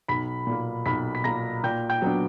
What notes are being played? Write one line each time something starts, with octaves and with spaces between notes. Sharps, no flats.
B1 B5 B6
A#2 A#3
B1 B5 B6
B6
A#2 A#3 A#5 A#6
A#2 G5 G6
G5 G6
F#3 B3 D4